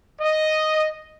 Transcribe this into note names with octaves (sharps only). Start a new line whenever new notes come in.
D#5